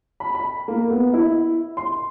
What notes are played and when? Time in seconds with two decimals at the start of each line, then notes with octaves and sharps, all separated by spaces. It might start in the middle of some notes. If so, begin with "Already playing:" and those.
0.20 B5
0.35 B5
0.68 A#3
0.90 B3
1.13 E4
1.77 C6